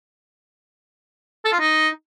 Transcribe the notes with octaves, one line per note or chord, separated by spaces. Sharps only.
A4
F4
D#4